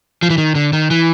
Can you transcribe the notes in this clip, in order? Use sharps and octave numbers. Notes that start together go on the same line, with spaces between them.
F3
E3
D#3
D3
D#3
E3